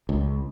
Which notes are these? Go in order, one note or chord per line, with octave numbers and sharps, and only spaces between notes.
C#2